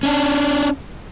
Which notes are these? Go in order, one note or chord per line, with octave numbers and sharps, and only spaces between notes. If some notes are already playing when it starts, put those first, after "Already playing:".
C#4 D4